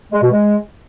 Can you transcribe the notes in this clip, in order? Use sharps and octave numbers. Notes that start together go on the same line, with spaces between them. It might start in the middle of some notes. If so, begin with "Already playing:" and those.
G#3
B2
G#3